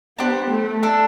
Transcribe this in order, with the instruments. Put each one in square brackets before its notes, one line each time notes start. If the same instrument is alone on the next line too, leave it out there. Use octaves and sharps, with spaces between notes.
[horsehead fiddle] B3 [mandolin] D4 G4 C5
[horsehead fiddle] A3
[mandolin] D4 A4 E5